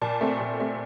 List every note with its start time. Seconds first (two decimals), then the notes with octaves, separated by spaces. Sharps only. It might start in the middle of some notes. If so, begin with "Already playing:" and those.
0.02 A#2 A5
0.21 A3 C4
0.40 A#2
0.60 A3 C4